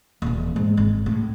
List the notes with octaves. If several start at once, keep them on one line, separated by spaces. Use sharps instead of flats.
D#1 E3
G#2
G#1
A2